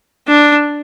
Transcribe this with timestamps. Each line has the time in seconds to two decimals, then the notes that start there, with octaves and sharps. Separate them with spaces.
0.28 D4